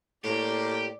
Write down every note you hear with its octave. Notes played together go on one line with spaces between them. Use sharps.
A2 A#3 G4 D5